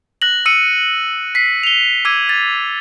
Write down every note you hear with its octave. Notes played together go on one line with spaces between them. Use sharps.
F#6 A#6 F#7
E6 C#7 D#7
B6 C7
F7 G7
D6 E6 G#6 D#7
A6